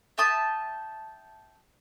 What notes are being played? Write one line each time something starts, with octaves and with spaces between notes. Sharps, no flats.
E5 G5 A5 D#6